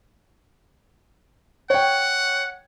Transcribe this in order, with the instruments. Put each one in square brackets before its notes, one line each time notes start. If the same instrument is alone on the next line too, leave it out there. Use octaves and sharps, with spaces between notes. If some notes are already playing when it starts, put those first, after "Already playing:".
[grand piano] C#5 G5 [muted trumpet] F#5